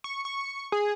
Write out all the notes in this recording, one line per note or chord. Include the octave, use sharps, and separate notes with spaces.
C#6
C#6
G#4